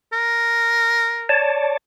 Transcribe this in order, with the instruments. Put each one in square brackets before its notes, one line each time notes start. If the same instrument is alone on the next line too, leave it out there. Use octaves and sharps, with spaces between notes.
[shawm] A#4
[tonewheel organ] C#5 D5 A5